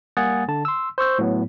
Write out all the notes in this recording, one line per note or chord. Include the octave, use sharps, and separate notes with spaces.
G3 A#3 F#5 G#5 D#6 A6
D3 A5
C6 E6
C5 C#6 E6 G6
A2 F#3 B3